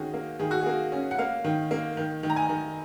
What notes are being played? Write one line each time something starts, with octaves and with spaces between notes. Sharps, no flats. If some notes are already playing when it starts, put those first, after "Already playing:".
Already playing: D#3 C#4 F#4 G#4
A#3
D#3 G#4
F#4
A#3 G#4
C#4
F#5
A#3 F5
D#3
A#3
D#3
D#3
A#5
G#5
D#3